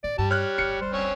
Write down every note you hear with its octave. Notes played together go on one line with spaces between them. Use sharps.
A1 D2 D5
G2 G3 A5
C#5 F6 F#6
D1 G1 C#7
G3 C5
C4 C#4 C#5